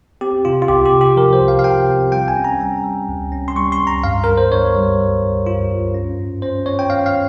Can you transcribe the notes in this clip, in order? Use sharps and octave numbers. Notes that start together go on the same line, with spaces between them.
C4 G4
C3 F4
F4
C2 G4
G4
C3
G4
F3 A#4
C5
C2
F5
F5
C3 G5
C4
G3 G5
G#5
C#4
A#5
G3
G3
C#2
C#4
C6
G3 C#6
C6
C#2
A#5
G2 F5
G2 A#4
C5
G2 C#5
G3
G3
G2
G2 F4
G2
C#4
G#2
C#4 C5
C#4 C#5
G5
C#4 F5
F5